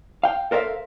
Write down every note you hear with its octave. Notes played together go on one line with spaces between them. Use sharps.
F5 G5
A4 A#4 C5 D5 E5 F5